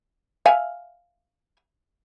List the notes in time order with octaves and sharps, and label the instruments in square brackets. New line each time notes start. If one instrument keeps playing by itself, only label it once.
[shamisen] E5 F5 G#5